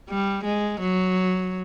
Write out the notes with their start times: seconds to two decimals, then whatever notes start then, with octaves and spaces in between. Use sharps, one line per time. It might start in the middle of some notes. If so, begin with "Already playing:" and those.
0.09 G3
0.44 G#3
0.80 F#3